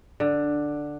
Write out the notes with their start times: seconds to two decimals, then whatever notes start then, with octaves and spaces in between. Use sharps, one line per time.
0.20 D3